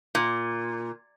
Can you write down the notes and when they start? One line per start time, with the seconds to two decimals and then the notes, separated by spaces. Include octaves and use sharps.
0.15 A#2